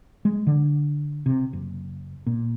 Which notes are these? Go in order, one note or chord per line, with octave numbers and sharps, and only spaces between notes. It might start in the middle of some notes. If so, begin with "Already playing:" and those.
G#3
D3
C3
F#1
A#2